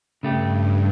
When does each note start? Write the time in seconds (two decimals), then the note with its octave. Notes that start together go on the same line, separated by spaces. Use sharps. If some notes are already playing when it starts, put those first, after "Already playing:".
0.23 G2 C#3 A3 G4